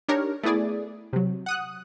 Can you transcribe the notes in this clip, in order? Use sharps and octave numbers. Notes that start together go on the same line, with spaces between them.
D4 D#4 G4 A#4 C#5
A3 B3 E4 G#4 D5
C3 F#3
F#5 D#6 F#6